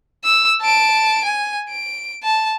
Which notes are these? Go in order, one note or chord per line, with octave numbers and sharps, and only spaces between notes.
E6
A5 D7
G#5
D7
A5